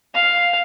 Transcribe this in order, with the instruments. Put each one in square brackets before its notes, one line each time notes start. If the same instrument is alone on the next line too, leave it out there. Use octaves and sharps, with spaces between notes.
[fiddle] F5